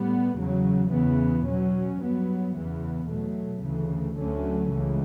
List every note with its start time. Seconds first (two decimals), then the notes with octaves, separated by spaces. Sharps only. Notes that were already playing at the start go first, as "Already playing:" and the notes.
Already playing: A2 G3 B3
0.37 E2 C#3 F#3
0.92 E2 C#3 E3 B3
1.46 B2 F#3 C#4
2.00 G2 F#3 B3
2.55 E2 C#3 E3 B3
3.08 B2 F#3 A3
3.63 D2 C#3 E3
4.18 D2 D3 F#3 A3 C#4
4.71 C#2 C#3 E3